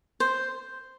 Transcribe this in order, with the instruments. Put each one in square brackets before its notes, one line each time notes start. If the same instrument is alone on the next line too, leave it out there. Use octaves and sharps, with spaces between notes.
[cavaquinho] C5